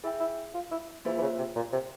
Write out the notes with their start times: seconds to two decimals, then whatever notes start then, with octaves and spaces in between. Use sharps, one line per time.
0.04 E4 G#4 E5 G5
0.20 E4
0.54 F4
0.71 E4
1.05 E3 A#3 F4 G#4 C5 E5
1.18 E3
1.22 C#3
1.39 C3
1.56 A#2
1.73 C3